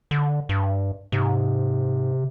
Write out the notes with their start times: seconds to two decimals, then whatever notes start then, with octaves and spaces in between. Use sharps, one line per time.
0.11 D3
0.49 G2
1.12 G#2 C3